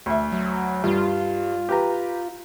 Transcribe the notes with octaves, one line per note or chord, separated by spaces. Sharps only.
D2 E5
F#3
G2 F4
G4 B4 A#5